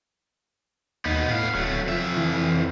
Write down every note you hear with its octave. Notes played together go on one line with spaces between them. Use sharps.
D#2 B3 D#4
A2 B3 F5
D1 F#3 A3
F2 F3 E5
E3